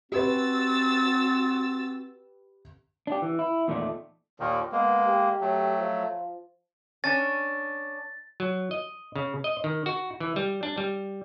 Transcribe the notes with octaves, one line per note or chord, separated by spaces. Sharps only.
C4 F#4 G4 B4 E6 A6
D4 G4
E3
E4
E2 A#2 D#3 A3 D5
D#2 A#2 D#3
G#3 A#3 B3
G4
F#3 A3
F3
C#4 D4 A6
F#3
D#5
C#3
D#5
D#3
F#4
E3
G3
D4
G3